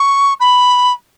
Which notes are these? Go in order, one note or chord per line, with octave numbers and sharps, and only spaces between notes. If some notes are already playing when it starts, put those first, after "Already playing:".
Already playing: C#6
B5